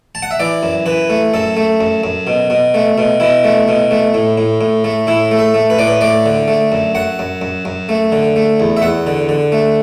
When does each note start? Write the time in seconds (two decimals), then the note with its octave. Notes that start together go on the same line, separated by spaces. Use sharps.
0.15 A5
0.22 F#5
0.31 E5
0.40 E3 D5
0.63 F#2
0.86 E3 B4
1.10 A3
1.34 F#2 A4
1.57 A3
1.80 F#2
2.04 F#2
2.27 B2
2.50 B2
2.74 A3
2.98 B2
3.20 B2 E4
3.44 A3
3.68 B2
3.91 A3
4.14 A2
4.38 A2
4.61 A2
4.84 A3
5.07 A2 E4
5.31 A3
5.39 A4
5.54 A3
5.70 B4
5.78 A2 D5
5.87 B4
6.01 A3 D5
6.26 D3
6.48 A3
6.72 F#2
6.95 F#2 F#5
7.19 F#2
7.41 F#2
7.65 F#2
7.89 A3
8.12 D3
8.36 A3
8.60 E2
8.77 E5
8.82 E2 F#5
9.07 D3
9.29 D3
9.52 A3